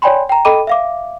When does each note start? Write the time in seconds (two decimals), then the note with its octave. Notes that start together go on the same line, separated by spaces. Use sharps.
0.02 C#5 D5 G5 G#5 B5 C6
0.29 G5 A#5
0.45 A4 D#5 G5 B5 D6 D#7
0.67 E5 F5 D6